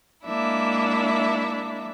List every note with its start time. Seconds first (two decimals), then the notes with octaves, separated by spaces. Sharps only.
0.24 G#3 A#3 D4 E4 E5